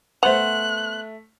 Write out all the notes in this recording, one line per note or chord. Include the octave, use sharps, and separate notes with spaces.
A3 B3 C5 F#5 F#6 F7